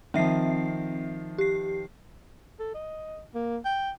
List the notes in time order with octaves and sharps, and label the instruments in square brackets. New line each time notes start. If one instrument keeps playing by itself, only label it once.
[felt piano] D#3 F3 [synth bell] C4 E5 C7
[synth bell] G4 C7
[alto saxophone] A4
D#5
A#3
G5